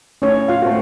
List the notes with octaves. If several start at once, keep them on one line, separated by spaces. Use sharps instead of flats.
A2 C#4 C#5
F4 F5
A3 C4 F#4